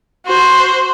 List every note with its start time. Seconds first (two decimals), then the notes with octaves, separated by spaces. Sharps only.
0.26 F#4 C5